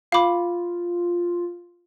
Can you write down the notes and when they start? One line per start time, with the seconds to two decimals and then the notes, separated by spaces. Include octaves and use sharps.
0.12 F4 F5 B5 D6